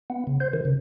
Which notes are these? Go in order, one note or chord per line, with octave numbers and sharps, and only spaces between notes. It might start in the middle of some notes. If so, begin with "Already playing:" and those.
B3
C#3
C5
D#3
C#3